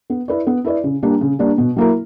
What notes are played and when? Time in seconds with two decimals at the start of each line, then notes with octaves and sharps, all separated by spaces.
0.10 B3
0.28 E4 B4 D5
0.47 B3
0.65 E4 B4 D5
0.84 C#3
1.03 G3 A#3 D4
1.21 C#3
1.39 G3 A#3 D4
1.58 B2
1.76 F#3 A#3 E4 A#4